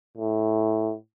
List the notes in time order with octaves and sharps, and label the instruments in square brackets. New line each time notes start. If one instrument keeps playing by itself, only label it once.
[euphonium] A2